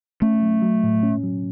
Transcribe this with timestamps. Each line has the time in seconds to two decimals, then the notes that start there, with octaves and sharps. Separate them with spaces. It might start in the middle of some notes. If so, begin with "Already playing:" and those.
0.22 A3 C#4
0.42 F#3
0.62 F#3
0.84 A2
1.03 C#4
1.23 F#3